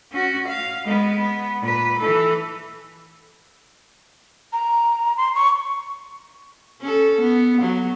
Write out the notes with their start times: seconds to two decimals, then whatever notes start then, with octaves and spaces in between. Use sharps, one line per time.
0.13 C#4 F#4
0.47 F5
0.85 G#3 B3
1.19 B3
1.62 A#2 B4
1.99 E3 A4
4.53 A#5
5.17 C6
5.35 C#6
6.81 C#4 A4
7.20 B3
7.61 F#3 B3